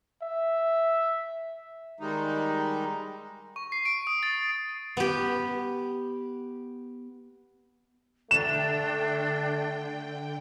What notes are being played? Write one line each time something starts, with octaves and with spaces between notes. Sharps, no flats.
E5
D#3 G3 G#3 D#4
C#6
C7
D7
D#6
A6
B3 G4
D3 A3 D4 G5 E7